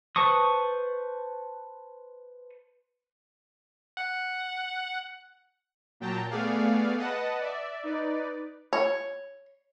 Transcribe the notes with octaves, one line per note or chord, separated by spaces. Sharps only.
B4 C5 A5 C#6 D#6
F#5
A#2 F#3 G5 A5 A#5
A3 B3 G#4 D5 F5
B4 D#5 F#5 A5
D5 E5
D#4 B4 D5
C#5